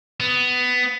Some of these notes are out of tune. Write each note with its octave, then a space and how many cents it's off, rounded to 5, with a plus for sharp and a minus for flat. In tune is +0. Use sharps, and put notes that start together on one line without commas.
B3 +15